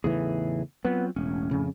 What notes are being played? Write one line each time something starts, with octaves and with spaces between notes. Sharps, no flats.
E2 A2 C#3 E3 D#4 G#4
F#3 B3 C4 F4
E1 A2 C#4
F2 C#3